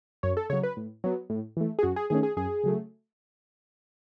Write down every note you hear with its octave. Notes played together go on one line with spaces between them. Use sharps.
F#2 C#5
A4
C#3 F#3 C#5
B4
A2
F#3 B3
A2
E3 A3
G#4
F#2 F#4
G#4
D#3 A3 C#4 G#4
G#4
F#2 G#4
C#3 F#3 A3